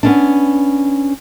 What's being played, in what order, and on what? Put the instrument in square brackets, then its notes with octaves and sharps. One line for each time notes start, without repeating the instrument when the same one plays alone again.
[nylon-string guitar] B3 C#4 D4